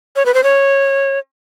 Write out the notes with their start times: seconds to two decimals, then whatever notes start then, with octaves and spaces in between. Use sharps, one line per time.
0.16 C#5
0.26 B4
0.34 C5
0.44 C#5